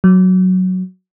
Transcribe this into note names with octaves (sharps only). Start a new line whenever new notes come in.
F#3